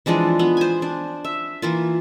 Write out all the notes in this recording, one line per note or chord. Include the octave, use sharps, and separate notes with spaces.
E3 F3 G#3 D4
B3
C5 G#5
D4
E5
E3 A#3 F4